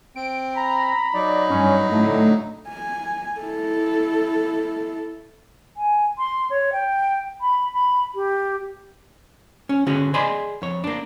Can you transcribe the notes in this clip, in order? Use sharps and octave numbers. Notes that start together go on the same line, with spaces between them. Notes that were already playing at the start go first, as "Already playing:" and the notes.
C4 D7
A#5 B5
F#3 D#4 D5
G2 C#4
A2 D3 A3
G#5
E4 A4
G#5
C6
C#5
G5
B5
B5
G4
C#4
D3 C#4 F#4 G#4
G#4 D5 D#5 B5 C6
F2 C#5
A#3 D4